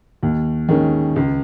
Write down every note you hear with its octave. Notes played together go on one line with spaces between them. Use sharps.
D#2
D#3 G#3 C#4
C#2